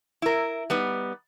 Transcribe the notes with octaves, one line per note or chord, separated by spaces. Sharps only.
E4 A#4
G3 B3 D#4